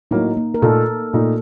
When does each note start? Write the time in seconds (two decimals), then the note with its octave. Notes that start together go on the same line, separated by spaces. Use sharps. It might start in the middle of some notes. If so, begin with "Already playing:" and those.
0.11 A2 F#3 A#3 D#4
0.37 A#3
0.54 A#4
0.62 A#2 A3 D#4 A4
1.13 A#2 A3 D#4